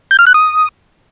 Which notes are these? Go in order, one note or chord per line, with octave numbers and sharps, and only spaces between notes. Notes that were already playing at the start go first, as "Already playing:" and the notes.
G6
F6
F#6
D#6